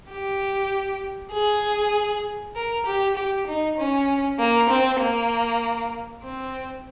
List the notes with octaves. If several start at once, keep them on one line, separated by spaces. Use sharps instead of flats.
G4
G#4
A#4
G4
G4
D#4
C#4
A#3
C4
A#3
C4